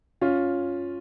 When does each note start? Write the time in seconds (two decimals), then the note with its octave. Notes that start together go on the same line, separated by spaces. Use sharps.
0.21 C#4 F4